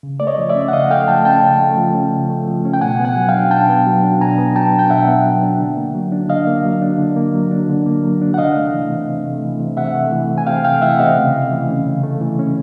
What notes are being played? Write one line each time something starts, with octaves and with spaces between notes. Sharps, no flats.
C#3
A3 D5
C#5 D#5
F3
D5 E5
C#4
F#5
C#3 D#5 F5
A3 F5 G5
F3 G5 A5
C#4 G5 A5
C#3
A3
F3
C#4
C#3
A3
F3
C#4
G5
B2 F#5 G#5
B3
F#5 G#5
F#3
F5 G5
D4
B2 G5 A5
B3
F#3
D4
B2 G#5 A#5
B3
F#3 G5 A5
D4
G5
B2 E5 F#5
B3
F#3
D4
D3
A#3
F#3
D4
D3 D#5 F5
A#3
F#3
D4
D3
A#3
F#3
D4
D3
A#3
F#3
D4
F#5
C3 D#5 F5
A3
E3
C3
C3
A3
E3
C3
C3 E5 F#5
A3
E3
C3
G#5
C3 F5 G5
A3 F5 G5
E3 E5 F#5
C3 D#5 F5
C#3
A3
E3
C#4
C#3
A3
E3
C#4